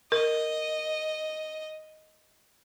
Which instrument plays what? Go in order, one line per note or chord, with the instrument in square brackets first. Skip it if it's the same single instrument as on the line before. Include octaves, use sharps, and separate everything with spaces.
[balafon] A#4 [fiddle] D#5